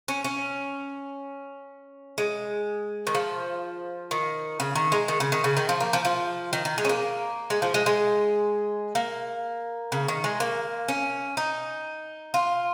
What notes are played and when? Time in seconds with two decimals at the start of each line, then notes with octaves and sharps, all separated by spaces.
0.08 C#4
0.24 C#4
2.18 G#3
3.07 D#3
3.15 F3
4.11 D#3
4.60 C#3
4.75 D#3
4.92 G#3
5.08 D#3
5.20 C#3
5.32 D#3
5.44 C#3
5.57 D#3
5.69 F3
5.80 A#3
5.93 F3
6.05 F3
6.53 D#3
6.65 D#3
6.78 G#3
6.85 C#4
6.89 A#3
7.50 G#3
7.62 F3
7.74 G#3
7.86 G#3
8.95 A#3
9.92 C#3
10.08 D#3
10.24 G#3
10.40 A#3
10.88 C#4
11.37 D#4
12.34 F4